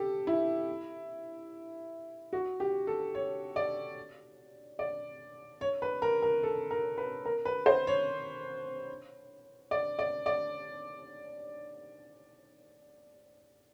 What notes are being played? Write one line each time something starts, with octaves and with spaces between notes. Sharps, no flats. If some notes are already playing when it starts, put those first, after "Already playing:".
Already playing: G4 A4
E4
F#4
G4
A4
C#5
D5
D5
C#5
B4
A#4
A#4
A4
A#4
B4
A#4
B4
C5
C#5
D5
D5
D5